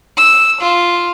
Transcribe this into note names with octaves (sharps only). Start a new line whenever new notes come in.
E6
F4